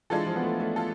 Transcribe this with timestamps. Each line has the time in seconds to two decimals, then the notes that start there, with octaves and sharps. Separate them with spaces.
0.10 E3 G#3 D4 F4 A4
0.27 F3
0.36 B3
0.43 A3
0.60 A3
0.76 F4 A4